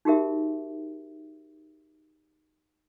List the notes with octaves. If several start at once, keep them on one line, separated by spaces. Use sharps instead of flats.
D#4 F#4 G4 A#4 E5